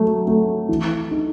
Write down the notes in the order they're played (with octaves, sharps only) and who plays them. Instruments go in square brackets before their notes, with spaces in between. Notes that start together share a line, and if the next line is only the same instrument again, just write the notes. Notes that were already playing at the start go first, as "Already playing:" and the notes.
Already playing: [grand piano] F#3 A3
A3
E3
D#4